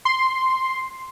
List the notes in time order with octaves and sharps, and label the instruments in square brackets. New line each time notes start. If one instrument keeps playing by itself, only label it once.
[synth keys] C6